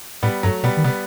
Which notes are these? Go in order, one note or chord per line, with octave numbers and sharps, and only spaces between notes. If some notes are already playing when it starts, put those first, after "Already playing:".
A2 G3 B3
G2 F#3 A3
B2 G3 B3
D#3
C3 G3 B3